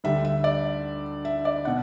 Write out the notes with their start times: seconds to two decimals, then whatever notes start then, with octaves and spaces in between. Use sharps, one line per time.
0.04 D2 D3 G3 E5
0.25 E5
0.44 D5
1.25 E5
1.45 D5
1.65 B2 F#5